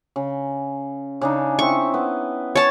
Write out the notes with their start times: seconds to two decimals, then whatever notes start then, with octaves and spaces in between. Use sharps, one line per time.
0.16 C#3
1.21 C#3 D4 D#4
1.59 C4 E4 D#5 C#6
1.94 B3
2.56 C#5 G#5 A5